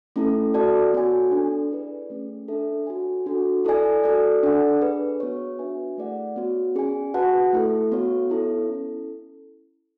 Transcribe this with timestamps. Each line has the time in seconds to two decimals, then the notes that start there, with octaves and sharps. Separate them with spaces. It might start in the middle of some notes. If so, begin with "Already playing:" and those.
0.16 A3 C#4 E4 A4
0.54 F#4 A4 D5 A5
0.93 B3 F#4 C#5 G#5
1.32 D4 A4 D5
1.71 E4 G#4 B4 D5
2.10 A3 C#4 G#4
2.48 D4 A4 E5
2.87 F#4 C#5 G#5
3.26 D4 F#4 A4
3.65 E4 A4 D5 G#5
4.04 F#4 A4 D5
4.43 D4 A4 D5 F#5
4.81 D4 G#4 B4
5.20 B3 F#4 C#5
5.59 D4 F#4 B4 E5 G#5
5.98 A3 E4 G#4 D5 F#5
6.36 B3 F#4 C#5
6.75 C#4 G#4 D5 G#5
7.14 F#4 B4 F#5 A5
7.53 A3 E4 A4
7.92 B3 F#4 C#5
8.30 B3 E4 A4 C#5
8.69 C#4 E4 A4